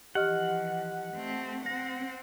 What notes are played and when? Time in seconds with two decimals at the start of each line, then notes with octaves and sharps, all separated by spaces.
0.15 E3 F3 G4 D#5 F#5 F6
1.13 A3 C4
1.66 C4 F#5 A#6